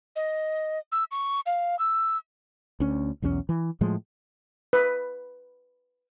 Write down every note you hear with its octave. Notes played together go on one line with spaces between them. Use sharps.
D#5
E6
C#6
F5
E6
D2 C#4
B1 E2 E3 C#4
E3
A2 F3 G#3
B4